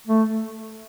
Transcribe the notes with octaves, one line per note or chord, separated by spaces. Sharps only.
A3